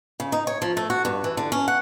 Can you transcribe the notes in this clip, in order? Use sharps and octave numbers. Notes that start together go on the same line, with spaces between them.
C#3
D#4
C#5
F3
A3
F#4
G2
E3
D3
C#4
F#5